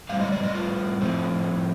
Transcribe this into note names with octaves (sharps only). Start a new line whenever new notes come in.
A2 G3 C4 F5
D#5
D5
D#5
F4
A2 F3 A3 C4